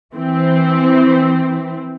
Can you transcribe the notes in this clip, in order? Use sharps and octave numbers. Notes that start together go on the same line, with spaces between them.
E3 C4